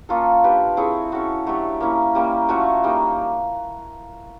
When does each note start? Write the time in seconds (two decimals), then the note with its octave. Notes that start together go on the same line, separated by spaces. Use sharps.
0.09 A#3 C#4 F4 A4
0.44 D4 G4 B4
0.77 C4 E4 G#4 C#5
1.12 C#4 F#4 A4
1.47 F#3 A3 D4 G4
1.80 A#3 C#4 E4
2.15 G3 A#3 C#4
2.48 F3 A3 C#4 F#4
2.84 G3 A#3 D#4